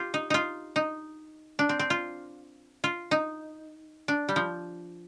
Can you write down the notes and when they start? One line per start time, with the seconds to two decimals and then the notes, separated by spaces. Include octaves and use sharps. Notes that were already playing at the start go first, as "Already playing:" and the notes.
Already playing: F4 G4
0.14 D#4
0.30 D#4 F4
0.76 D#4
1.59 D4
1.69 C4
1.79 C4
1.90 F4
2.84 F4
3.11 D#4
4.08 D4
4.29 G3
4.36 F3